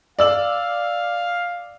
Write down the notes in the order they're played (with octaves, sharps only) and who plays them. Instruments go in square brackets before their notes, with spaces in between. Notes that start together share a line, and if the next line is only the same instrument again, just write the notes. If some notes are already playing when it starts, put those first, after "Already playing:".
[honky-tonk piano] D5 E6 F#7 [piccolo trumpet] F5